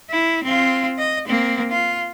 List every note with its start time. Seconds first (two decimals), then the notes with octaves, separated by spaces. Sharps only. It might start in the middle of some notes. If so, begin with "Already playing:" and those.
0.10 E4
0.44 C4 F4
0.98 D#5
1.27 A#3 C4
1.71 F4